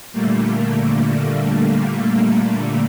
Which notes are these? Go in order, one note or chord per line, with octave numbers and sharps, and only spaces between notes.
A#2 D3 G3 A3 A#3